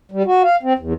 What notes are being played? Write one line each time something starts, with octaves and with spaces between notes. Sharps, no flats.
G3
F#4
F5
C4
E2